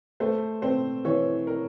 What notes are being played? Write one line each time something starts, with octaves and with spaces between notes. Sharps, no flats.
A3 C5
C4 C5
E3 C#5
A#4